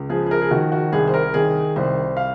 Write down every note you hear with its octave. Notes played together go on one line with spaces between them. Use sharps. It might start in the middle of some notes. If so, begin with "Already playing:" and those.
Already playing: C#2
F3 G#4
G#4
A#4
G#4
D#3 F#4
F#4
C2 G#4
C5
A#4
D#3 G#4
C2 C5
F5